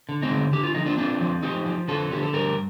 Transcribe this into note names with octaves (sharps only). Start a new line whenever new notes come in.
D3
C4 D#4
D3
D3 G4
F4
F3 D#4
D4 F4
C4 D4 F4
F3
F3 D#4 G4
F3
D3 F4 A4
D3 G4
A4
G2 G4 A#4